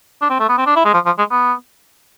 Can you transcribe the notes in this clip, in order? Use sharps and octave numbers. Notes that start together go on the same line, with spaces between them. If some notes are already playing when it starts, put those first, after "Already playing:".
D4
C4
A3
B3
C4
D4
E4
G#3
F3
F3
G#3
B3